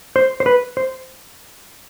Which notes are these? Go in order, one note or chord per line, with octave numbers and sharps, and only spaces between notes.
C5
C5
B4
C5